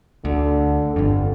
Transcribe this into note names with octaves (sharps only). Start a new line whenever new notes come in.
D2 D3
G1 F2 D3